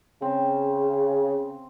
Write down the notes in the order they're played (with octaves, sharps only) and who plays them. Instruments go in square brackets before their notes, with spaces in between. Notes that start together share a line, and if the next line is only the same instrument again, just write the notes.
[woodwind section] C#3 [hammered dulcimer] C4 E5